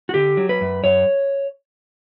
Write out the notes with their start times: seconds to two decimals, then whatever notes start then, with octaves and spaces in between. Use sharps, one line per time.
0.09 F#4
0.14 D3 G4
0.37 F#3
0.49 B4
0.61 F#2
0.84 F#2 C#5